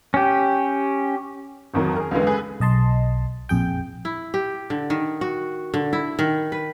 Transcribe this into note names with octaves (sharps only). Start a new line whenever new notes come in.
C#4 G4
A1 F2 D#3 F#3
G#4 A#4
C#2 F#2 D3 E3 G#3
G#4 A4 B4
B1 D#5 A5 C6
A#1 F2 G#4 G5
E4
G4
D3
D#3
F#4
D3
E4
D#3
B4